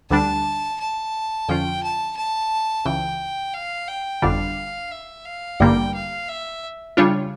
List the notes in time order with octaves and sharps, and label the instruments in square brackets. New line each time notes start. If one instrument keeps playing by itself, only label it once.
[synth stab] D2 D3 G3 D4 [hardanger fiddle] A5
[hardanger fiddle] A5
[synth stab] F2 D3 F3 C#4 F4 [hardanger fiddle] G5
[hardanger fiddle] A5
A5
[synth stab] C#2 C#3 E3 [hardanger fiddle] G5
[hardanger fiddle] F5
G5
[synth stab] G1 F2 D3 G3 D4 [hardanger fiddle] F5
[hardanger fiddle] E5
F5
[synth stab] A1 G2 D3 G3 A#3 [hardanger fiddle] G5
[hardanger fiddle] F5
E5
[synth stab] C#3 G3 D4 F4 C#5